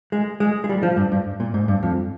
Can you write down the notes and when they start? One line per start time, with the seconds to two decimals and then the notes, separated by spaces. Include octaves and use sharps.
0.12 G#3
0.40 G#3
0.64 G#3
0.69 G3
0.83 F3
0.97 G2
1.12 G2
1.40 A#2
1.54 G#2
1.68 G2
1.83 F2